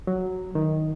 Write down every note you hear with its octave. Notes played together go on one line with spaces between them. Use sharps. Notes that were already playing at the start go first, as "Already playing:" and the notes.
F#3
D#3